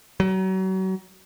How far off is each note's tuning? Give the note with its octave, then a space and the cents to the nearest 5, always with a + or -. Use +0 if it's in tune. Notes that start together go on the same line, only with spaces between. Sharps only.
F#3 +35